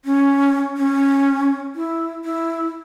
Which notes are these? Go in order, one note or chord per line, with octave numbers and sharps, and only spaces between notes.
C#4
C#4
E4
E4